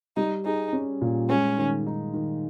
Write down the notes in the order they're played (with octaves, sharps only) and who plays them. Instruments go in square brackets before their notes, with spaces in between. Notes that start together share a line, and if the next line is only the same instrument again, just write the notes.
[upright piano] G3 [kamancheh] D#4
[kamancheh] D#4 [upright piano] G#4
[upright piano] C#4
A#2
[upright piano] G#3 [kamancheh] C#4
[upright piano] D#3
D#4
D#3